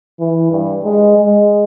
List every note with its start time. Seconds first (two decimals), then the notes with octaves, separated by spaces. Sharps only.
0.20 E3
0.51 G2
0.84 G#3
1.18 G#3